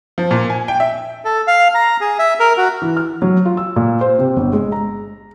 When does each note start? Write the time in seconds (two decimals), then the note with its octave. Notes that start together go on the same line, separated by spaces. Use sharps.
0.18 F3
0.31 A#2
0.50 G#5
0.68 G5
0.80 E5
1.25 A4
1.47 F5
1.75 A#5
2.01 G#4
2.19 E5
2.40 A#4
2.57 F#4
2.82 E3
2.97 F6
3.22 F#3
3.45 F4
3.57 E6
3.76 A#2
4.01 C5
4.18 C3
4.37 G1
4.53 G#3
4.72 A#5